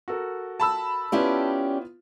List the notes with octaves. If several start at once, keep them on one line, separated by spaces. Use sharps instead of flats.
F#4 A4 A#4
A5 B5 E6
B3 C#4 E4 F4 G4 D5